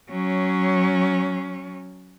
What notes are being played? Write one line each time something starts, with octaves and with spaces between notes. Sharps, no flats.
F#3 C#4